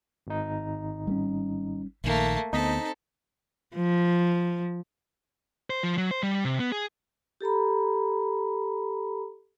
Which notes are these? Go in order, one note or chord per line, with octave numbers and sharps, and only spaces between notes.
G#1 D#4
G3 A3 C#4
A#1 A#2 D#3 A3 A#3
D2 B3 C4 D#4 A4 D#5 B6
F3
C5
F3
F#3
C5
G3
C3
B3
G#4
G4 A4 A#5 B5